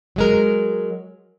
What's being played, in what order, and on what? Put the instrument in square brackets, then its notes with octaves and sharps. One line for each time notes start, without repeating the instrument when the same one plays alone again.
[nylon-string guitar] F#3 G#3 A#4